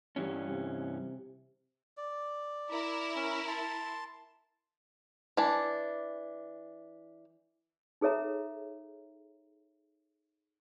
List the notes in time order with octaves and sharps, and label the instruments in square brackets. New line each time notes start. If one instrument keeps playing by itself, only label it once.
[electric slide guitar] G2 E3 C#4 [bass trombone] G3
[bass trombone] C3
[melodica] D5
[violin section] E4 A#4
[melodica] C#4
A5 C6
[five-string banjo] E3 D4
[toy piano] D#4 G#4 A4 C#5 E5 A#5